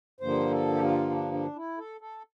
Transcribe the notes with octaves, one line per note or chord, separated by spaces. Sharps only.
G2 D3 F3 A#3 C5
A4
G4
F4
D4
D4
E4
A4
A4